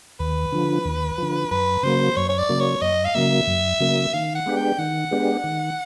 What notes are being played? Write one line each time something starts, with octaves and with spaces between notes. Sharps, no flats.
D#2 B4
D3 F3
D#2
D3 F3
F#2 B4
C#3 F#3 A#3 C5
F#2 C#5
C#5
D5
C#3 F#3 A#3
C#5
F#2 D#5
F5
C#3 F#3 A#3 E5
F#2
C#3 F#3 A#3
D#3 F5
F#5
G#3 B3 D4 G4
G5
D#3 F#5
G#3 B3 D4 G4
D#3